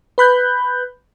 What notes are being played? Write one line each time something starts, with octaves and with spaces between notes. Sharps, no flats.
B4 B5 F#6 G6